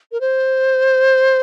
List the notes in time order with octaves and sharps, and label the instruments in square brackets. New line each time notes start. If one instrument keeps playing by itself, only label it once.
[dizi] A#4
C5